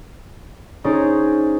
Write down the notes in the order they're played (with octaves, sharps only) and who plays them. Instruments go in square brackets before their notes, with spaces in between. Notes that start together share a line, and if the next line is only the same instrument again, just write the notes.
[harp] C#4 D#4 G#4 C5 D5 A#5